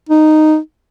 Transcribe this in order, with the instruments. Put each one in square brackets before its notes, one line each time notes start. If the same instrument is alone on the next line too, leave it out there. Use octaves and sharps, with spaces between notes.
[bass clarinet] D#4